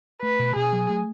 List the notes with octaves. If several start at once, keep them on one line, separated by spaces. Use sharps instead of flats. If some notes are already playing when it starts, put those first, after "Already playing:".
A3 B4
B2
B2 G#4
F#3
A3